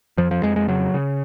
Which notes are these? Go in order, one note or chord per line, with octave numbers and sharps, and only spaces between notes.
F2 F3
F3
F2 G#3
G#3
C#3 F#3
C#3